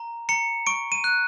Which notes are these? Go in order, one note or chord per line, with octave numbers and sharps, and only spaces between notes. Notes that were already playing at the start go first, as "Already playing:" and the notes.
Already playing: A#5
A#5 C#7
C#6 D7
D#7
F#6